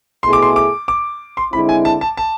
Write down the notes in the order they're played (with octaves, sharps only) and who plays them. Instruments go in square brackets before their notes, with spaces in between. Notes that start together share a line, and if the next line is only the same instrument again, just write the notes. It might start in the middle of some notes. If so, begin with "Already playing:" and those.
[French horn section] B2 A3 E4 G#4 [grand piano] C6
[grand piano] D6
C6
D6
D6
C6
[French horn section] D3 G#3 C4 E4 [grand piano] B5
[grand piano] G#5
A5
A5
A5